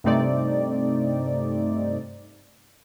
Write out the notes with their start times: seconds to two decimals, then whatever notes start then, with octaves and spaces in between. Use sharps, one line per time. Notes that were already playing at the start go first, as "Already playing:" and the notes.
0.04 G2 C3 A3 C4 D#4 D5